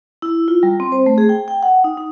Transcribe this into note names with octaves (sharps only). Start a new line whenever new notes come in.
E4
F4
G3
C4
C5
A3
G#4
G5
G5
F#5
D#4
D#4